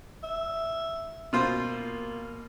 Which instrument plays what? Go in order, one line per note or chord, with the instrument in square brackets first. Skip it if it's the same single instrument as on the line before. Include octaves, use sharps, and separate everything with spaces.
[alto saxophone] E5
[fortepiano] B2 F4 C5 [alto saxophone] A#3